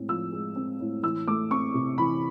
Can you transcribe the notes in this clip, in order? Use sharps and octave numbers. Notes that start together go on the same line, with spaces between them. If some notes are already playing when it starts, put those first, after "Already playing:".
Already playing: A2 G#3 C4
F3 E6
G#3
C4
A2
E3 E6
A3 D6
C4 C#6
C3
E3 B5